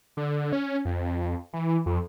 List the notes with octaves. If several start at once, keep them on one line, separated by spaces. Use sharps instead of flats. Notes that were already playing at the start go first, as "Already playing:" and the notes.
D3
C#4
F2
F2
E3
F2